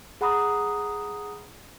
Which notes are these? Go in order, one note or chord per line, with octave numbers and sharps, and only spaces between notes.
G#4 F#5 A#5 B5 D#6